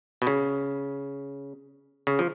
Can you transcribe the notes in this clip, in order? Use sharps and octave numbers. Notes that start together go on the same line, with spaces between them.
B2
C#3
C#3
F3